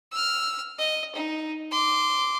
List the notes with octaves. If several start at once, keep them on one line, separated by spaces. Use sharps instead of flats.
E6 F6
D#5
D#4
C6 D6